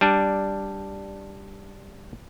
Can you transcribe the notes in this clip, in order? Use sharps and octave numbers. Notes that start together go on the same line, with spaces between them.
G3 D4